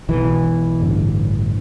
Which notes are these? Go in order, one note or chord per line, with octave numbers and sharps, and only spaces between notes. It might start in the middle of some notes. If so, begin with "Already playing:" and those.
B1 B2 E3
A1 G2 D3